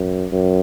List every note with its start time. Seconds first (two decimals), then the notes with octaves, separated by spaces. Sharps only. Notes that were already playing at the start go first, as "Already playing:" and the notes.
Already playing: F#2
0.32 F#2